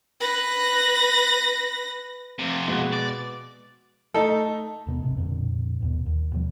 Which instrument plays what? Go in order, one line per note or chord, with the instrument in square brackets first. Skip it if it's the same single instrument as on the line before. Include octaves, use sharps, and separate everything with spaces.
[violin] B4 A#6
[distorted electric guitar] F2 C3
[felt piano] B2 G#3 B3
[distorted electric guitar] D5
[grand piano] A3 D#4 [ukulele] A4
[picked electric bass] D#1 B2 B3
G#1 C3
B1 F2 A#2 D3
G1 D#2 B2
D#2
D#2 B2 F3 G3